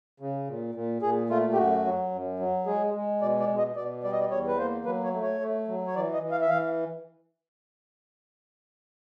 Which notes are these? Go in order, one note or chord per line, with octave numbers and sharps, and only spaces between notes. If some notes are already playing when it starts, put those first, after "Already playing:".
C#3
A#2
A#2
A#2 G#4
A3 F4
G4
F#2 F#4
F#3
F#2
F#3
G#3 G#4
G#3
B2 D5
D5
B2
D#5
B2 D5
G3 D5
D#5
D5
E2 C#5
B4
A#3 C5
F#3 B4
C#5
A3
C#5
A3
F#3
C#5
E3 D5
D#5
E3
F5
E5
E3 F5